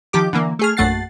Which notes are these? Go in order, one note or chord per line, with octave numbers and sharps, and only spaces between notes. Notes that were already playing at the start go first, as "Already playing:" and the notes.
D#3 F3 G4 D6
D3 E3 A#3
A3 G#4 F6
A#1 F#2 A3 F#5 A6 C7